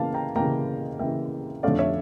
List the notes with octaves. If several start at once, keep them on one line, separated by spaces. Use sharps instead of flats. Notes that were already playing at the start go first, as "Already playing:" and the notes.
Already playing: C#3 E3 A#3 F5 A5
G5 A#5
C#3 E3 A#3 G5 A#5
C#3 E3 A#3 E5 G5
F2 D3 A3 C#4 D5 F5
C#5 E5